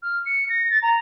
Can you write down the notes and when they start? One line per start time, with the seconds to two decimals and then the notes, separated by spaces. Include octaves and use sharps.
0.02 F6
0.26 C#7
0.49 A#6
0.70 A6
0.82 A#5